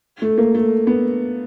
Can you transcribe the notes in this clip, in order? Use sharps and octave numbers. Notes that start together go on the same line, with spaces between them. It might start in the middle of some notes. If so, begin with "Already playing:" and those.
A3
A#3
A3
B3